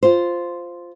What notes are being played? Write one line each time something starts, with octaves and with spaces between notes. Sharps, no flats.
F4 C5